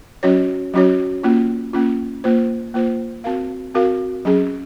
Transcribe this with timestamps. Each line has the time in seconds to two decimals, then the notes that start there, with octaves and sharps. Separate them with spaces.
0.23 F#3 C#4 F#4 C#5
0.74 F#3 C#4 F#4 C#5
1.23 A#3 C#4 F4
1.73 A#3 C#4 F4
2.24 A#3 F4 C5
2.74 A#3 F4 C5
3.24 C4 F#4 A#4 F5
3.74 C4 F#4 A#4 F5
4.25 F#3 C#4 G#4